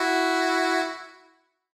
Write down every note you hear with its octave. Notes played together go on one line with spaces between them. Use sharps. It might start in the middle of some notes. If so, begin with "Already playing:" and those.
Already playing: E4 F#4